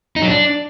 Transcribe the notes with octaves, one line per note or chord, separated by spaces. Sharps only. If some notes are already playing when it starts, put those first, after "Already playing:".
D#4
F#3
D4